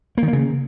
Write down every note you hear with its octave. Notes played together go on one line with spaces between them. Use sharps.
A#3
D#3
A#3
C#3